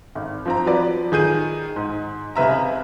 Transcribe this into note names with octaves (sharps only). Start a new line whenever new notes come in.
G#1
F3 C4 A#5
F3 F#3 B4 D5
D#3 G#4 G6 D#7
G#2
C#2 C3 B4 E5 A#5